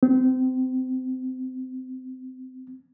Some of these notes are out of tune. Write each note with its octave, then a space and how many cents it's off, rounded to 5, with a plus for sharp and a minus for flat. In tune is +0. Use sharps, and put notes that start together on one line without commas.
C4 -30